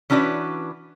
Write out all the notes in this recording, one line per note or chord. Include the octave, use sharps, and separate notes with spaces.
E3 C#4 D4 F#4 B4 D5